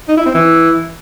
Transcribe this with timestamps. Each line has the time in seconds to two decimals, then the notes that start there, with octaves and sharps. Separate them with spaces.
0.08 D#4
0.17 E4
0.26 C4
0.34 E3